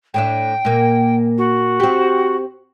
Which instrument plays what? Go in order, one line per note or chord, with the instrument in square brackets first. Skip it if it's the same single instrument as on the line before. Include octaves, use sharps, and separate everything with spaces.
[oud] A2 D4 E5 [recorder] G5
[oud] A#2 A#3
[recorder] F#4
[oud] C4 G4